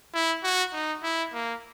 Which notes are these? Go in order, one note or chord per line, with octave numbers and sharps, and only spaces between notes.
E4
F#4
D#4
E4
A#3